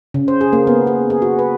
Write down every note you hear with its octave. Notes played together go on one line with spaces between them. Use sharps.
C#3
C5
G#4
A#3
B3
G#4
G#4
F#4
B4